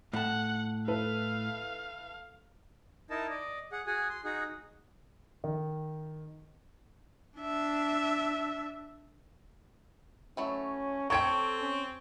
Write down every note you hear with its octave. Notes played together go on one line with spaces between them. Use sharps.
A2 F#5 A5
E4 A4 B4 F5
D#4 E4 A#4 D#5 A5
D5 D#5
G#4 F#5
F#4 G#4 G#5
C6
D#4 F#4 G#4
D#3
D4 E5
E3 F#3 A3 C#4
C4 G4 A4 C#5 G5 C#6 G#6 D7
C#4